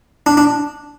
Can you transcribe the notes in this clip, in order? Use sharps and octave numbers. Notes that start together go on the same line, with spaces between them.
D4
D4